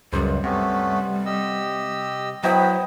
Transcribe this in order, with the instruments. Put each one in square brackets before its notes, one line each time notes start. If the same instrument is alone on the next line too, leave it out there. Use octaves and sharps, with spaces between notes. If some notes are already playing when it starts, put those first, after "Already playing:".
[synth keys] C#2 F#2 [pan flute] G3 [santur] C5
[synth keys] C3 [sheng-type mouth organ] A3 B3 C#4
[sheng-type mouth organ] G4 D#5 E6
[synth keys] F#3 E4 [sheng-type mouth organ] B3 B5 [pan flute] C5 [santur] D#5 G5 D#6